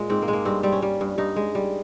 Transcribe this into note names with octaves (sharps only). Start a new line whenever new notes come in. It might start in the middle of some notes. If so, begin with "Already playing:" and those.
Already playing: A#2 G#3
G#2 C4
A#3
G#3
A#3
G2 C4
G3 C4
C#4
G3
G2
G2 D#4
G#3
G3